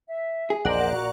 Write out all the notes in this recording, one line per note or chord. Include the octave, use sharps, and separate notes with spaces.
E5
G#4
A#1 E2 A#4 C5 D5 D#5 F#5
A#2 F#4 A#5